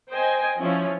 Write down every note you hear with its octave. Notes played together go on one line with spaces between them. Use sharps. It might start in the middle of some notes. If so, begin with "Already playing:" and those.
C5 D#5 G5 G#5
F3 C#4 E4 F4